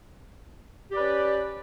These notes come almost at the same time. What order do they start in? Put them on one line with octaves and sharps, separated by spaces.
G4 D5 B4 C#4